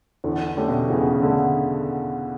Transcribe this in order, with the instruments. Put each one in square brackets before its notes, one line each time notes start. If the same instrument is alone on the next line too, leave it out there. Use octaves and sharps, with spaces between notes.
[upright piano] E2 [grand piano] D3
[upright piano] D3 A3 C#4 G4
[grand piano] B2
[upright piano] E2 [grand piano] C#3
[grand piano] D3
[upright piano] D3 A3